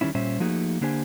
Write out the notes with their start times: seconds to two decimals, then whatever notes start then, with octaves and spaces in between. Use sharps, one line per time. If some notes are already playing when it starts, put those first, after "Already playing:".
0.01 D#3 G3 C#4 E4
0.15 A#2 G3 C#4 C5 E5
0.40 F3 A3 A#3 D#4 F#4 G#4
0.81 D3 A#3 D4 G4 C5 G#5